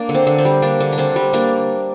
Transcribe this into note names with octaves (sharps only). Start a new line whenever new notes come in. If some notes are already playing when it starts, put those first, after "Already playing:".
Already playing: A#3 D4
D3
C4
D3
C4
G3
A#3 D4
D3
D4
D3 C4
G3
A#3 D4